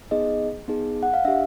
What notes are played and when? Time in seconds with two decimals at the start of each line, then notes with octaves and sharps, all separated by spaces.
0.11 B3 D#4 G#4 D#5
0.68 B3 D#4 G#4
1.03 F#5
1.14 F5
1.25 D4 G4 E5